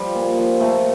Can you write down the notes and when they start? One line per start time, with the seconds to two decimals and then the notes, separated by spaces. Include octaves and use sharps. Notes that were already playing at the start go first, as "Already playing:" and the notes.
Already playing: F3 G3
0.15 A#2
0.37 F3
0.60 A#2 A3